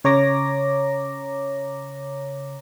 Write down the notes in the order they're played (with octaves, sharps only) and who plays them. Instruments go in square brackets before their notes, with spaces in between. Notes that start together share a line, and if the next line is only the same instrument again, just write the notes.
[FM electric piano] C#3 C#5 A#5 D6 A#6